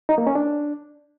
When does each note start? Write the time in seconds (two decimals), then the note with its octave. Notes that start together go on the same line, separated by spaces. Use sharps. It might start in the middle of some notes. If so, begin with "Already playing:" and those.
0.09 D#4
0.18 A#3
0.27 C#4
0.35 D4